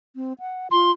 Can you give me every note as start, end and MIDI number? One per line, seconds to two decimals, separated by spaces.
0.16 0.33 60
0.40 0.68 78
0.71 0.91 65
0.71 0.92 84